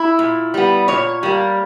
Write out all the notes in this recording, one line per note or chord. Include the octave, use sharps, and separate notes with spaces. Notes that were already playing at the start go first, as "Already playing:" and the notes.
Already playing: E4
A#2
G3 B3
A#2 C#5
G3 A#3